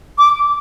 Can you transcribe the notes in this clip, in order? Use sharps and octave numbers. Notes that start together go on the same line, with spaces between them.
D6